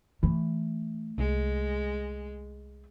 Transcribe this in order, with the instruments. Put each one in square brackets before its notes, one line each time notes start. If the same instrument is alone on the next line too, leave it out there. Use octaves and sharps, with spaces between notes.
[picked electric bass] E3 [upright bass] A3
[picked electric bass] C2 [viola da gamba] G#3